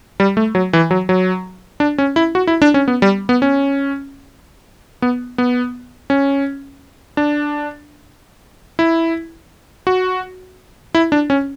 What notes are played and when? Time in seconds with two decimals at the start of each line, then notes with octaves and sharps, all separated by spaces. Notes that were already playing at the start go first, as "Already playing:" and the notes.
0.20 G3
0.37 A3
0.55 F#3
0.73 E3
0.91 F#3
1.09 F#3
1.80 D4
1.98 C#4
2.16 E4
2.35 F#4
2.47 E4
2.62 D4
2.74 C#4
2.88 B3
3.02 G3
3.29 B3
3.42 C#4
5.02 B3
5.38 B3
6.10 C#4
7.17 D4
8.79 E4
9.87 F#4
10.95 E4
11.12 D4
11.30 C#4